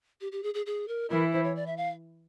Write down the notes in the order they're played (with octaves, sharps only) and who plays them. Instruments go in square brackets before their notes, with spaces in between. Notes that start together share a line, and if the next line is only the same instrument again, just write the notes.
[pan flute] G4
G4
G#4
G#4
G#4
A#4
[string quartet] E3 E4 [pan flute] A#4
[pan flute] C5
C#5
D5
E5
F5